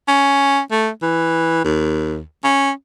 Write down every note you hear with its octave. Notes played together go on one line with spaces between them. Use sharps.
C#4
A3
E3
D#2
C#4